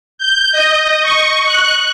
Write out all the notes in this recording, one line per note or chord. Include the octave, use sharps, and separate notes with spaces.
G6
D#5
C#6
F#6